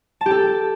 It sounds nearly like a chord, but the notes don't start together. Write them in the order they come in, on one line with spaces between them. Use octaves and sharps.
A5 G4 A4